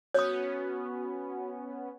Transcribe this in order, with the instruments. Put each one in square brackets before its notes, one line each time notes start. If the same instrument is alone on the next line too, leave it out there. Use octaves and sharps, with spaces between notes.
[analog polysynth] B3 C#4 [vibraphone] F#4 [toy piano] C#5 D#6